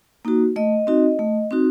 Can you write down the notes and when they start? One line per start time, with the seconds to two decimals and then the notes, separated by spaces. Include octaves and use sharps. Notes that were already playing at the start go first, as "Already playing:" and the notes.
0.25 A#3 D#4 F#4
0.56 A3 D#5
0.87 C4 D#4 F#4
1.19 A3
1.51 C4 D#4 F#4